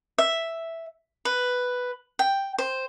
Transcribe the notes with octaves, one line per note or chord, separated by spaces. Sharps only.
E5
B4
G5
C5